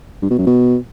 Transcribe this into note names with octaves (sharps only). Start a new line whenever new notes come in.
G2
B2
F#2
B2